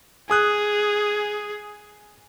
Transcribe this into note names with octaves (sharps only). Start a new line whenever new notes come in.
G#4 G#5 D#6 F#6